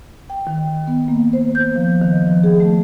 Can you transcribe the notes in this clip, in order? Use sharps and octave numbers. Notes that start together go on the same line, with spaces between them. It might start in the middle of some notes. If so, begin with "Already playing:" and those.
G5
D#3
B3
A#3
C5
G6
F3
D#3
F3
G#4
A3